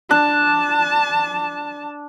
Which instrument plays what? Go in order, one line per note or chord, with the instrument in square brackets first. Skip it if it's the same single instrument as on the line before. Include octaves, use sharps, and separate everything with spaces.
[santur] D4 [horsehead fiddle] A5